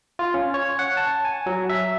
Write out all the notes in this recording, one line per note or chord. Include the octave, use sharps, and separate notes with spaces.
F4
C#4
C#5
F#5
A5
G#5
F#3
E5